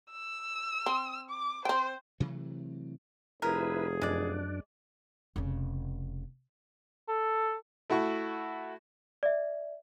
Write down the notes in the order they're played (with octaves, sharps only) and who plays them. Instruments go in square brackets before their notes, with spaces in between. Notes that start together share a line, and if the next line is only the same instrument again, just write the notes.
[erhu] E6
[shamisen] C4
[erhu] D6
[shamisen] C4 G5 [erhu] C5
[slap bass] C3 E3 F#3 A3
[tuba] F1 [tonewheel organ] E4 B4 [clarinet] G#4 [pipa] A#4
[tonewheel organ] F#2 D4 [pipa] G#3 D5
[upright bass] F1 C#3
[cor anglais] A4
[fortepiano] A3 E4 F#4 C#6
[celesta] D5 E5